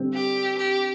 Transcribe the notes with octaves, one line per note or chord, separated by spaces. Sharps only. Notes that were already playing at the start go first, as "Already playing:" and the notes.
Already playing: D3 G3 C4
G4
G4